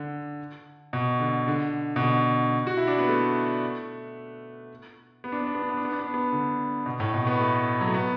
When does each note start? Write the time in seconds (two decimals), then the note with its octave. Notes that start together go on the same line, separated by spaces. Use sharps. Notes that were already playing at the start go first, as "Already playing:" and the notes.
Already playing: D3
0.93 B2
1.20 D3
1.47 D3
1.96 B2
2.01 D3
2.67 F#4
2.77 E4
2.87 D4
2.99 B3
3.09 A3
5.24 B3
5.32 D4
5.40 B3
5.47 D4
5.55 B3
5.62 D4
5.69 B3
5.77 D4
5.85 B3
5.92 D4
5.99 B3
6.07 D4
6.14 B3
6.32 D3
6.86 B2
7.00 A2
7.14 B2
7.27 B3
7.40 A3
7.81 F#3
7.87 A3
7.94 B3